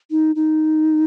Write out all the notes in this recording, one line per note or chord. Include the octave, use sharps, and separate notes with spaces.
D#4
D#4